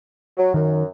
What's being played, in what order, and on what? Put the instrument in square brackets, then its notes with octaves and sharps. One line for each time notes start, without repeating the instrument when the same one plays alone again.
[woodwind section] F#3
[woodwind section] F#2 [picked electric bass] D#3